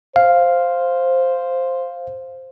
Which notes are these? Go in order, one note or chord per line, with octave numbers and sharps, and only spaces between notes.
C5 F5